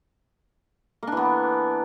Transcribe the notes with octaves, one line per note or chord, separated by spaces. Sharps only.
E3 A#3 B3 D4